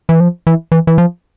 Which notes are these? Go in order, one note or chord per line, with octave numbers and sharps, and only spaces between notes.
E3
F3
E3
E3
E3
F3